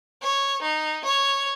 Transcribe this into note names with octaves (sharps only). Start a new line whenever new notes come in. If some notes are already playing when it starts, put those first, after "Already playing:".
C#5
D#4
C#5